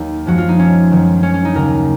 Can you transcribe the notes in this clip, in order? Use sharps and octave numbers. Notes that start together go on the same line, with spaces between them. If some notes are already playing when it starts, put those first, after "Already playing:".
Already playing: D#2 D#3 F#3 A#3
F#2 F3 G#3 F#4
F4
D#4
C#4
F#2 D#3 F#3
C#4
C#4
D#4
D#2 C#3 F#3 A#4